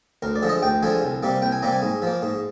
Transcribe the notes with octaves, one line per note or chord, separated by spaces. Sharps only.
D2 A#4
D5
D3 F3 G#3
D#5
D2 G5
D3 F3 G#3 G#5
C2
C3 G3 A#3
C2 G5
G#5
C3 G3 A#3 A#5
G#5
G#2
F3 A#3
G#2